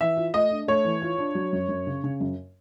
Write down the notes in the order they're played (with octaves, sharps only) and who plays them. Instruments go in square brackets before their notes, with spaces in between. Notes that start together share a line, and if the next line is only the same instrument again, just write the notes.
[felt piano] E3 [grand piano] E5
[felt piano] F4
[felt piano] A3 [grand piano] D#5
[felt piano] D4
[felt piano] A3 [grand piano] C#5
[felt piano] E3
F4
D4
F#3
F#2
F#2
C#3
C#3
F#2